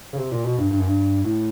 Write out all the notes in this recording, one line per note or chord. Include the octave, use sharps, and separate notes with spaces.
C#3
C3
A#2
B2
G2
G2
F#2
G2
A2